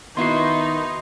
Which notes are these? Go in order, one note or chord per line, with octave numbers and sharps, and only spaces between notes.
D#3 B3 D#4 E4 F#4 C6 C7